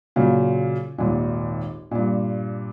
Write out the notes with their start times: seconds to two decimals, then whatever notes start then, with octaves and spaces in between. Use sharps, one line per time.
0.16 A#2 C#3 F#3
0.98 G#1 D#2 A#2
1.91 G2 A#2